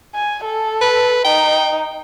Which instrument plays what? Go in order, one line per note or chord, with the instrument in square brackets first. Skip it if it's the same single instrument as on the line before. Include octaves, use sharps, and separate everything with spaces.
[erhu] G#5
A4
[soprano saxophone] B4
[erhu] D#4 [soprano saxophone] G5